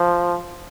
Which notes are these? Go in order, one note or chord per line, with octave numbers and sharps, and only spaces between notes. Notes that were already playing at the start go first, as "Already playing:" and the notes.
Already playing: F3